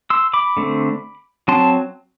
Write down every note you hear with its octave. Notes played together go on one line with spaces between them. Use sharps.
C6 E6
B5 D6
D3 A3 C4
F#3 C4 A5 C6